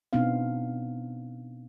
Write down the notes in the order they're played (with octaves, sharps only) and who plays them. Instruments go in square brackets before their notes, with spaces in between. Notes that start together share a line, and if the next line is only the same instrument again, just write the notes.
[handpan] B2 B3 C4 D4 D#4 F5